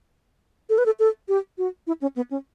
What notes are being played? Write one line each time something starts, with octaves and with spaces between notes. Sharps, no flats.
A4
B4
A4
A4
G4
F#4
E4
C#4
B3
C#4